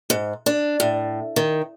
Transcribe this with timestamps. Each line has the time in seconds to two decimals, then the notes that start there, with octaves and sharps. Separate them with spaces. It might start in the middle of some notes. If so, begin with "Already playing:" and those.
0.10 G#2
0.46 D4
0.80 A2
1.36 D#3